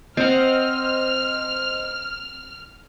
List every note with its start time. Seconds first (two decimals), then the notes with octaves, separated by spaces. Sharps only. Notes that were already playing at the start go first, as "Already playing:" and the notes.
0.17 C4 C5 D#5 F#5 F6